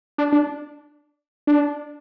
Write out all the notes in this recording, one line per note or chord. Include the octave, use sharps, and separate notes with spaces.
D4
D4
D4